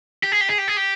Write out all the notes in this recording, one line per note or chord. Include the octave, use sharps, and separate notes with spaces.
G4
G#4
G4
G#4
G4
G#4
G4